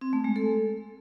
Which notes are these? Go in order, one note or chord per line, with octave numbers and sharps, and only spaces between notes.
C4
A3
G#3
A4